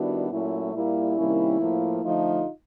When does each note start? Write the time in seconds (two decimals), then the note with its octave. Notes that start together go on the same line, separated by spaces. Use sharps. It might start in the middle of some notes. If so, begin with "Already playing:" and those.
Already playing: D#3 G3 B3 D4 E4 F#4
0.30 A#2 F#3 A3 C#4 E4
0.74 A#2 G3 A#3 E4
1.16 C3 D#3 G3 A#3 C#4
1.60 A2 F3 A#3
2.03 D3 F3 A3 D#4 F4